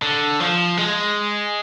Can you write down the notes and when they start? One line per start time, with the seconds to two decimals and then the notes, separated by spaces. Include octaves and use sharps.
0.02 D3
0.40 F3
0.77 G#3